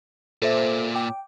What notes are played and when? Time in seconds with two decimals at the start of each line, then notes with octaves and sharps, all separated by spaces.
0.42 A#2 A4 C5 E5
0.95 G5 D6